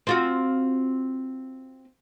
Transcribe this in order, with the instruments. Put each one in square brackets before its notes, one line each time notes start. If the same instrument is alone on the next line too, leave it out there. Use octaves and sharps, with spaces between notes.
[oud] C4 F4 F#4